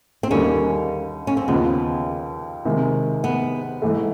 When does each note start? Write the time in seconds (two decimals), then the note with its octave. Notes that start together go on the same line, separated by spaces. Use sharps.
0.23 C4
0.31 D#2 D3 G3 A#3 C#4 D#4
1.27 C#4
1.37 C4
1.48 D#2 C#3 F3 B3
2.65 C3 D#3 G#3
3.24 B3
3.82 G#2 E3 A3